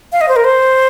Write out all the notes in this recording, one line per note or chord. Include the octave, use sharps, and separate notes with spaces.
F5
D#5
C5
A#4
C5